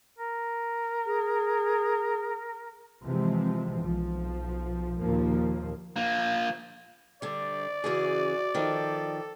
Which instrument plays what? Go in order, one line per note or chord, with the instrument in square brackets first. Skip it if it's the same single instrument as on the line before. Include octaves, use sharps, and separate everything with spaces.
[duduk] A#4
[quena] G#4
[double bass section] C3 E3 F3 G#3 C4
B1 F3
D#2 A#2 F3 A#3
[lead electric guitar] F3 A#3
[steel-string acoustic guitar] D3 G3 [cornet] D5
[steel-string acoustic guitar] C#3 E3 G#4 [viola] F#4
[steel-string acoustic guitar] D#3 F3 [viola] A4